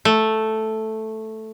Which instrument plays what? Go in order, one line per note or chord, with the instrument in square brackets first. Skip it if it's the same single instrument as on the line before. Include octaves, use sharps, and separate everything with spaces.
[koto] A3